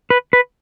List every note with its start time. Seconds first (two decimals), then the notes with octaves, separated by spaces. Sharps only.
0.10 B4
0.33 B4